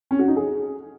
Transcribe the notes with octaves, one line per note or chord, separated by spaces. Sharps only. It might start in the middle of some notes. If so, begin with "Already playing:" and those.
C#4
F#4
D#4
G#4